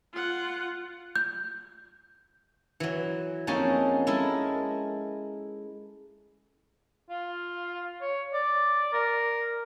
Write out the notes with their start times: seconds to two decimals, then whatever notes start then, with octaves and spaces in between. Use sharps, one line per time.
0.13 F4 F#5
1.16 G6
2.80 E3 F#3
3.47 F2 A#3 C#4 D#4 G#4 A5
4.07 G#3 E4 A4 A#4
7.10 F4
8.01 C#5
8.34 D5
8.93 A#4